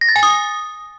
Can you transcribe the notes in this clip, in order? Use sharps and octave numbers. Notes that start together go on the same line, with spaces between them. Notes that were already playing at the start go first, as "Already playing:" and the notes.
A#6
A6
G#5
D#6